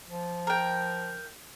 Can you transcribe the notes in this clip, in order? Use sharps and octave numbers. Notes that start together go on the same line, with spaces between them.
F3
A#4 G5